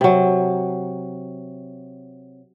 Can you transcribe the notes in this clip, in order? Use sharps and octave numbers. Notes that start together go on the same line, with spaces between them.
C3 F#3